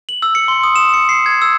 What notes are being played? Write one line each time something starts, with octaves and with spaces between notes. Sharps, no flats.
F#7
E6
C#7
C6
D#6
E7
C#7
C7
G#6
E6